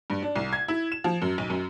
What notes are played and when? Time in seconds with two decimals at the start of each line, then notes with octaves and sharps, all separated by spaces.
0.10 G2
0.22 D4
0.36 C2
0.53 G#6
0.68 E4
0.92 E7
1.04 F3
1.22 F#2
1.38 B1
1.50 F#2